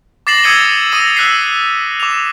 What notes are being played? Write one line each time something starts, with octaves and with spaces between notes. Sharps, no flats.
D6 A6 A#6 C7 E7 F#7
D#6 E6 G#6 C#7 D#7 G7
D#6 E6 A#6 D#7
E6 F#6 B6 C7
D6 F7